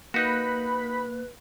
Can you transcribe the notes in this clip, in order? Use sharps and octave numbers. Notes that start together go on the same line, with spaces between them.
A#3 D#4 F#4 B4 B5 F#6